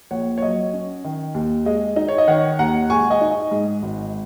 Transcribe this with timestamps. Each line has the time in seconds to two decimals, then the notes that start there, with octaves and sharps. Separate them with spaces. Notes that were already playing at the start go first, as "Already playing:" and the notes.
0.11 A#1 C#5 F#5
0.38 C#5
0.42 F#3 D#5
0.73 C#4
1.05 D#3
1.34 D#2
1.66 G#3 D#5
1.96 D#4
2.08 C#5
2.18 D#5
2.27 D#3 C#5 F#5
2.59 D#2 F#5 A#5
2.90 G#3 G#5 C#6
3.10 D#5 G#5
3.21 D#4
3.31 D#5
3.51 G#2
3.82 G#1